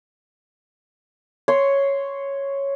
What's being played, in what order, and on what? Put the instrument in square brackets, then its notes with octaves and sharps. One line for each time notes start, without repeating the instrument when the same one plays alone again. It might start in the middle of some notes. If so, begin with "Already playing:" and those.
[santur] C#5 C6